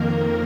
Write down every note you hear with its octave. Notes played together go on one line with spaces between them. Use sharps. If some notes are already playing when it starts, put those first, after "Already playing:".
Already playing: F2 D#3 A#3 A#4